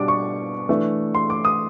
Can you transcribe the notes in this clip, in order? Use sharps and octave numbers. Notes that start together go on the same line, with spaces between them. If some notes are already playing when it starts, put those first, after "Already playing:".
Already playing: B2 G3 B3 D4 D6
C#6
E3 A3 D4
C6
D6
D#6